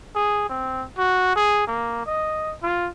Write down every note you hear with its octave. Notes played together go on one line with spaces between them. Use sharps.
G#4
C4
F#4
G#4
A#3
D#5
F4